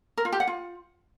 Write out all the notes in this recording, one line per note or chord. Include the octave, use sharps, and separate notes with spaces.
A#4
F4
G4
F#5
F4